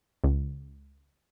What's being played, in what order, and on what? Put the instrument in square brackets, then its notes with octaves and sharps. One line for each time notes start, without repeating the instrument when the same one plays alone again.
[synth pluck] C#2